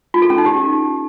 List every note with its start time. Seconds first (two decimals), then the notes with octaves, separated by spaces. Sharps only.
0.14 F4
0.22 A4
0.30 C#4
0.38 D#4
0.46 G4